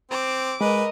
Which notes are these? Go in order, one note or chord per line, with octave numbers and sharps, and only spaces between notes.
C4 D6
G#3 A#4 B4 D#5